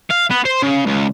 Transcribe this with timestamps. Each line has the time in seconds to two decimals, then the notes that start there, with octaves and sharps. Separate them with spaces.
0.10 F5
0.31 B3
0.45 C5
0.63 C#3
0.86 C#2